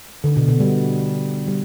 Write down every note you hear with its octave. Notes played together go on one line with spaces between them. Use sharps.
D3
B2
B2
G3
G3